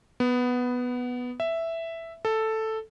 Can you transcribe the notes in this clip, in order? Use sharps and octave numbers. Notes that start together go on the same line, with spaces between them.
B3
E5
A4